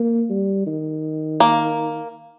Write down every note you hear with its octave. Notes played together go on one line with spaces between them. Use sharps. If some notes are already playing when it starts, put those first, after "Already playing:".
Already playing: A#3
G3
D#3
A#3